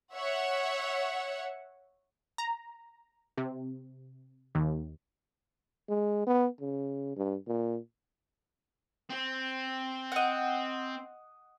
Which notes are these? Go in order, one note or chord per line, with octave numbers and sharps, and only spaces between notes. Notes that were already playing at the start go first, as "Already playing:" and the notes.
C#5 E5 F#5
A#5
C3
D#2
G#3
B3
C#3
G2
A#2
C4
D#5 F#5